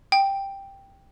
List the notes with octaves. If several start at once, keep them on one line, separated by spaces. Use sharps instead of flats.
G5